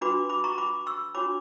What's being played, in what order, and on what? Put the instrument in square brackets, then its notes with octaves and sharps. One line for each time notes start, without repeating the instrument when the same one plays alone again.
[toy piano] D4 F#4 B4 B5 D6
B5 D6
A#5 C#6
B5 D6
C#6 E6
D4 F#4 C#5 B5 D6